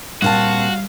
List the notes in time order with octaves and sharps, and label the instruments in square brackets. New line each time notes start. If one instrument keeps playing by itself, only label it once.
[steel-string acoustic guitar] A#2 C4 A5 [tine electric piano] G3 [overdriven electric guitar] F#4 [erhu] F5